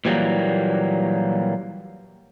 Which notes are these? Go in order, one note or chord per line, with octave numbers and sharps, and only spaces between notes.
A#2 E3 F#3 G3 A#3